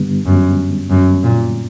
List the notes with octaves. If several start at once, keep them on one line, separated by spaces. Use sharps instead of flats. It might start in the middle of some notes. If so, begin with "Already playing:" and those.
Already playing: G2 D3 G3 B3
F#2
F#2
A#2